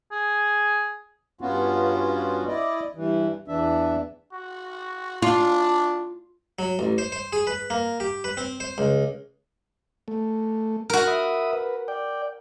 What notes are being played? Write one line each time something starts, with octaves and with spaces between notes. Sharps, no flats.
G#4
G2 B3 C#4 F4 F#4
E4 D5 D#5
G2 E3
E2 E3 D4 E5
F#4
D4 F4
F#3
A1
C5
C5
G#4
B4
A#3
G4
B4
C4
C5
C#2
A3
F#4 A#4
E5 B5 D#6
B4
D5 G5